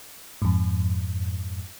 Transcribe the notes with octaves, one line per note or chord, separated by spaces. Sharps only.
F2 G#2